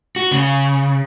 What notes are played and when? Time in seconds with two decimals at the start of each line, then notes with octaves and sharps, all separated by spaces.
0.16 F#4
0.31 C#3